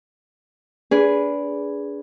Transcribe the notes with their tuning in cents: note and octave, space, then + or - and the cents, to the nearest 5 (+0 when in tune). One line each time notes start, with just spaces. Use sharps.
D4 -25 G#4 +0 B4 +0